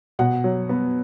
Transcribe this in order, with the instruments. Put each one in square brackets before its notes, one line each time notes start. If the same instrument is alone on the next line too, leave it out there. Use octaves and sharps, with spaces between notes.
[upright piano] B2 F#5
F#3
B3